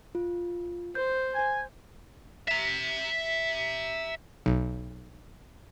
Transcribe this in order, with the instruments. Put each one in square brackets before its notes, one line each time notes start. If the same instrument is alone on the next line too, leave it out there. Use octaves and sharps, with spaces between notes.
[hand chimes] F4
[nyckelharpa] C5 [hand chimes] G6
[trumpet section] G#5
[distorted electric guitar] E5 A#5
[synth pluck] B1